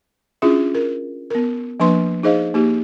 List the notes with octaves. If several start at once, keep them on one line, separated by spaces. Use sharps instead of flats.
C#4 D4 E4 F4 G#4 E5
A#4
B3 A#4
F3 A#3 D4 B4 C6
D#4 G#4 C5 D#5 F5
A#3 D#4 G4